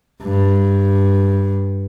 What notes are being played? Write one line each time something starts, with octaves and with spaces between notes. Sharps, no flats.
G2